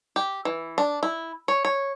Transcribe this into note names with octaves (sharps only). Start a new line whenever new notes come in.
G4
E3
D4
E4
C#5
C#5